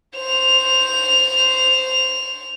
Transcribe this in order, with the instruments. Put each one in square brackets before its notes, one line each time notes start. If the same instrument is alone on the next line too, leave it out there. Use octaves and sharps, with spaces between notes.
[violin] C5 F7